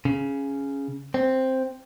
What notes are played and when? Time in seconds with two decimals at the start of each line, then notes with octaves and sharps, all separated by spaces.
0.05 C#3
1.14 C4